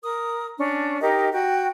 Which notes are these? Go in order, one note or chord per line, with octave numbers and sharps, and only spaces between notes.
A#4 D#6
C#4 D4
D#4 G4 A#4 D#5
F#4 G5